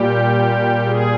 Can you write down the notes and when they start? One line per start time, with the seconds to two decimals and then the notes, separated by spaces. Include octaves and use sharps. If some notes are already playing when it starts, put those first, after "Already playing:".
Already playing: A#2 G3 G4
0.86 G#4